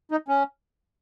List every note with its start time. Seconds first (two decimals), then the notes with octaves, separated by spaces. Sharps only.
0.11 D#4
0.28 C#4